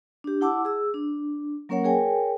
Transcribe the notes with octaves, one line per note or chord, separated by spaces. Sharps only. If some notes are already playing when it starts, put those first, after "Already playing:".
D4 G4
E4 F#5 A5 D6 E6
G#4 E6
D4
F#3 A#3 C#4 A#4 C#5 F#5
G#4 A#4 C#5 G5 G#5